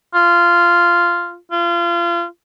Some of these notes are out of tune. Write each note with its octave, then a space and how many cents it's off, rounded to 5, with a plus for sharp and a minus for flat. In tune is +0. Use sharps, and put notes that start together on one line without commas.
F4 -10
F4 -30